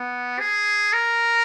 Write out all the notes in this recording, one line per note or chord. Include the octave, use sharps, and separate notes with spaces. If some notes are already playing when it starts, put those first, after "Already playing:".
Already playing: B3
G#4
A#4